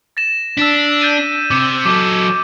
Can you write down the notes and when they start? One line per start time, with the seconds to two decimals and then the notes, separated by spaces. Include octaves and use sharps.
0.17 A6 A#6 E7
0.58 D4 E6 B6
1.02 G6 A6 D#7
1.51 C3 D6
1.85 F#3 A4 D6